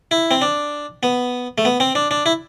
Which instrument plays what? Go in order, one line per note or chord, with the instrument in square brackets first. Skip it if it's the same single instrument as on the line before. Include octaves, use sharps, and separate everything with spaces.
[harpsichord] E4
C4
D4
B3
A3
B3
C4
D4
D4
E4